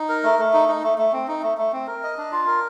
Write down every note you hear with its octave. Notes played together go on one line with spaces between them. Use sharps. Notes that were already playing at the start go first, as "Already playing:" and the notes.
Already playing: D#4
A#4
A3
A3
D#4
D#4
A3
A3
C4
D#4
A3
A3
C4
A#4
D#5
D4
F4
A#4